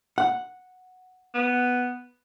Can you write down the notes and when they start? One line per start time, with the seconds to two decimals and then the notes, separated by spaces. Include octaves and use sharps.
0.18 F#5
1.34 B3